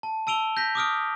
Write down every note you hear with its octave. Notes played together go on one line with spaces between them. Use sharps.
A5
A5 E6 D7 F7 G7
G6 A#6 B6
D6 D#6 F6 D7